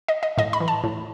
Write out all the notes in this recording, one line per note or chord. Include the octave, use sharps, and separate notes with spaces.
D#5
D#5
A2 D#5
B5
E3
A5
A2